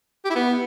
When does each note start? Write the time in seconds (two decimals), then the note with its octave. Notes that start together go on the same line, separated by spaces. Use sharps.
0.25 G4
0.30 E4
0.35 B3